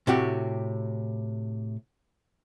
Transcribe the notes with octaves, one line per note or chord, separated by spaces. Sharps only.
A2 C3 F#4 G4